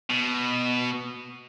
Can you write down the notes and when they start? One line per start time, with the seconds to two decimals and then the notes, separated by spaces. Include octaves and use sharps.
0.10 B2